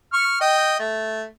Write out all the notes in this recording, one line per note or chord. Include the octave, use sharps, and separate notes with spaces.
C#6 F6
D#5 G5
A3